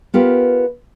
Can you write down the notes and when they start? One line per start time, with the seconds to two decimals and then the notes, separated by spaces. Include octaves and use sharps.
0.14 B3 F4 G4 A#4 B4